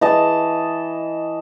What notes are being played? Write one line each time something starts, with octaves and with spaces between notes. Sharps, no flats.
E3 D#5 A5